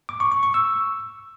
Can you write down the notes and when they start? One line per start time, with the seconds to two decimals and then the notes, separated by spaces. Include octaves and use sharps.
0.09 D6
0.20 C#6
0.32 C#6
0.43 C#6
0.54 E6